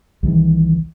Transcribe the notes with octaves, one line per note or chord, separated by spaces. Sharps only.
C2 D#3 E3